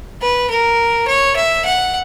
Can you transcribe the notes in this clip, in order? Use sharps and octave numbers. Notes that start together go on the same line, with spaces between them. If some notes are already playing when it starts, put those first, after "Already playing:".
B4
A#4
C#5
E5
F#5